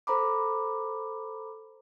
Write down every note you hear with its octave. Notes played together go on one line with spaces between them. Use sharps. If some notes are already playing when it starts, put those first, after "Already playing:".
A4 C5 A#5 B5 D6